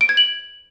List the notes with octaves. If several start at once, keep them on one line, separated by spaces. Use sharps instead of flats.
D7
G#6
F#7